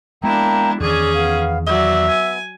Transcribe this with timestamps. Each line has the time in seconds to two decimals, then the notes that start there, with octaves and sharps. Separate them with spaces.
0.24 G#3 A#3 B3 D4 E4 G5 A#5
0.80 E2 D#3 C#4 G#4 D5
1.15 B3 F5
1.67 F#3 B3 D5 E5
2.09 G#5